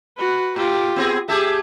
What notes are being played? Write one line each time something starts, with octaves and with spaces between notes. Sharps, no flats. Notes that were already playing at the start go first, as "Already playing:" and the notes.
F#4 B4
A2 F4 G4
B3 C4 G#4
A3 G4 G#4 E5